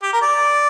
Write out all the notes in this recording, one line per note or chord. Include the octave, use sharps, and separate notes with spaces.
G4
A#4
D5